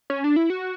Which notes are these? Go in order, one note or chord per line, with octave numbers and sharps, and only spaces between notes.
C#4
D4
E4
F#4